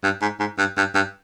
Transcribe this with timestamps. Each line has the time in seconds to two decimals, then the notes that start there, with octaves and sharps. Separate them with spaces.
0.04 G2
0.22 G#2
0.40 G#2
0.58 G2
0.77 G2
0.95 G2